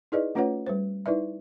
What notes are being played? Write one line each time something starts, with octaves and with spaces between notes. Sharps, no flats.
D#4 E4 G#4 B4 D5 D#5
A3 C#4 F4 B4 C#5 F#5
G3 B4 C5
D#4 E4 B4 D5 E5